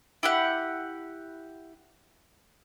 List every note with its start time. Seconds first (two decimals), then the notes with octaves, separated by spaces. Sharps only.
0.23 E4 G4 F#5